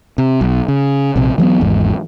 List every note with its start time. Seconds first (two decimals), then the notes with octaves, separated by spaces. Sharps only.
0.18 C3
0.41 B1
0.68 C#3
1.16 A#1 C3
1.38 E3 F#3 A3 B3
1.60 G#1 E2 G#2